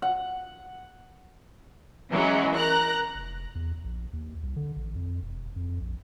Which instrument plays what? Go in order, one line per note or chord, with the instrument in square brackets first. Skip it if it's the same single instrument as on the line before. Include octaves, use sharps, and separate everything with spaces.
[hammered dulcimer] F#5
[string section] E3 F#3 G#3 C#4
A#4 A#5 F#6
[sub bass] F1
E2
A#1
D#2
C2
D3
A1
F2
E1
F2
A#1